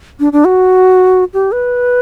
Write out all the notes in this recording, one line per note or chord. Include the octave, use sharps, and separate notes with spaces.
D4
D4
F#4
G4
B4